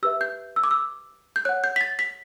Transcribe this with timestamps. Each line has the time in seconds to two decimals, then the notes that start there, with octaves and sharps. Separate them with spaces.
0.03 G4 B4 E5 E6
0.21 G6
0.56 E6
0.64 D6
0.71 E6
1.36 G6
1.45 C#5 F#5 F#6
1.64 G6
1.76 B6
1.81 A6
1.99 B6